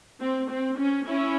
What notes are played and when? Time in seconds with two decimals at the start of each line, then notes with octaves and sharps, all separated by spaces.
0.21 C4
0.50 C4
0.78 C#4
1.07 C#4 E4